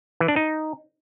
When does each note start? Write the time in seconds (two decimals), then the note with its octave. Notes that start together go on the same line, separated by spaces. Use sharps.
0.20 E3
0.28 D4
0.36 D#4